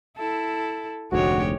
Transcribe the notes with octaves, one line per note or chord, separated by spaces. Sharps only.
E4 A4
F1 D2 G#2 G#3 F#4 G4 C#5